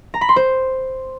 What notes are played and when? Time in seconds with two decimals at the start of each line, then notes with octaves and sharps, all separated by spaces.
0.14 A#5
0.21 B5
0.29 C6
0.36 C5